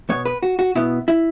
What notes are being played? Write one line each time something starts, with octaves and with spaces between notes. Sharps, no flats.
B2 B3 C#5
B4
F#4
F#4
B2 B3 E4
E4